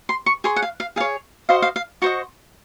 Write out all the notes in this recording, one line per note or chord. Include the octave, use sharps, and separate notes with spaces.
C6
C#6
G#4 C#5 C6
F#5
F5
F5
G#4 C#5 F5
F#4 C5 D#5 F5
F5
F5
F#4 C5 D#5 C#6